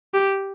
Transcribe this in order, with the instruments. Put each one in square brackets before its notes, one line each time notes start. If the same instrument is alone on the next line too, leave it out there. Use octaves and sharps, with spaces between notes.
[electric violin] G4